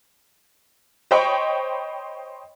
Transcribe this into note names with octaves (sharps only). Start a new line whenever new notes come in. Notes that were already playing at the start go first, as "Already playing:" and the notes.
C5 C#5 D#5 G5 B5 C#6